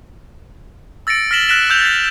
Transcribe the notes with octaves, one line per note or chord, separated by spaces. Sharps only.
E6 A6 A#6 C#7 D7
F6 A#6 B6 E7 F#7 G7
F6 F#6 A#6 B6 D7 E7
E6 G6 F7
A6 B6